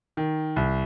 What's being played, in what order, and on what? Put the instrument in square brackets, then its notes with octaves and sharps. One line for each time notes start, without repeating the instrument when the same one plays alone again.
[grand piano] D#3
C2